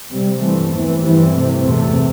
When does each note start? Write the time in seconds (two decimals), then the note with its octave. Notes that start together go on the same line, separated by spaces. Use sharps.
0.11 C3 G3 C4
0.40 G2 E3 A3 C4
0.71 E2 E3 C4
1.01 G2 E3 G3 C4
1.31 C3 A3 C4
1.61 E2 C3 A3 C4